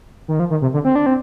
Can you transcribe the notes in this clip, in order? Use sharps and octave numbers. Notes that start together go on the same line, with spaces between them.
D#3
F3
D#3
C3
D3
C4
D4
C4